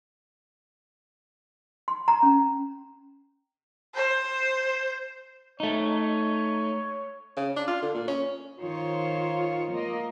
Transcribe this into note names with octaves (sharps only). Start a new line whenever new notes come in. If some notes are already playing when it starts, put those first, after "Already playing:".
C6
A#5
C#4
C5
A3 D#4 C#5
C#3
D4
F4
D3
A#2
C#4
D#3 F4 C5 C#5
A#3 D#5